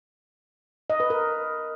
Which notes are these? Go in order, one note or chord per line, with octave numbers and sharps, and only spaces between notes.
D#5
B4
A#4